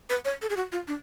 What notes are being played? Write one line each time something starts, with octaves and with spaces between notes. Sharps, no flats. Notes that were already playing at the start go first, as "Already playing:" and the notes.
B4
C#5
A4
G#4
F#4
F4
D4